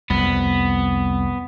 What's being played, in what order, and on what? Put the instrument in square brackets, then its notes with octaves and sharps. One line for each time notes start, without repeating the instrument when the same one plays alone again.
[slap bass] C2 F2 [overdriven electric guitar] B3